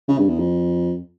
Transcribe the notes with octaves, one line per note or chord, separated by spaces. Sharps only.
C#3
G2
E2
F2